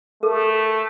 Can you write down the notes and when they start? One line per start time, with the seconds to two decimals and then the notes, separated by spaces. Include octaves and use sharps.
0.23 A3 A4 A#4